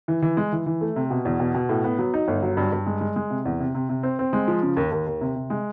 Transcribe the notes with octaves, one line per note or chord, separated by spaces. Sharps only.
E3
E3
G#3
E3
E3
A3
C3
B2
E2
B2
B2
A2
B3
F#3
D#4
G1
F#3
G2
G2
G#3
G#3
G#3
C3
E2
C3
C3
C3
C4
C4
G#3
F3
C#3
D#2
D#2
D#2
C3
C3
G#3